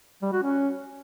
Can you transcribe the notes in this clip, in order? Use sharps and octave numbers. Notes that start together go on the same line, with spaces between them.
G3
F#4
C#4